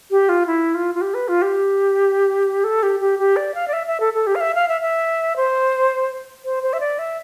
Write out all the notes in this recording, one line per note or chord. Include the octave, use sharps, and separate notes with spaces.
G4
F4
E4
F4
F4
G4
B4
F4
G4
A4
G4
G4
G4
D5
F5
D5
E5
E5
A4
A4
G4
F5
E5
F5
E5
E5
C5
C5
C5
E5
D5
E5